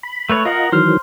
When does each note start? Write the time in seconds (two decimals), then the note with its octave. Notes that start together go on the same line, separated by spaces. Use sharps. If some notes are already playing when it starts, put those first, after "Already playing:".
0.03 B5
0.30 A3 B4 C#5
0.45 F4 A#4 D#5 F5 F#5
0.72 D#3 E3 F#3 C5 F6